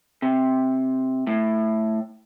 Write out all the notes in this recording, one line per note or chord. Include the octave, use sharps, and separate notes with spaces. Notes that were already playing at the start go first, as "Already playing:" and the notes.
C3
A2